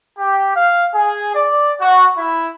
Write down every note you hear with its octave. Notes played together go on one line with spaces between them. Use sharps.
G4
F5
G#4
D5
F#4
E4